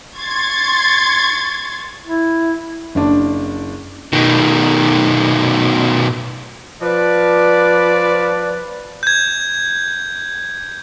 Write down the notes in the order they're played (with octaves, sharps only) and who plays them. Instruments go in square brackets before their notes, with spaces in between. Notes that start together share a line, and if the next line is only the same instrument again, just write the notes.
[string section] C6 C#6 G#6 A6
[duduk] E4
[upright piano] F#1 D4
[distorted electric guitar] B2 D#3
[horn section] F3 B4 D5
[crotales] G6 G#6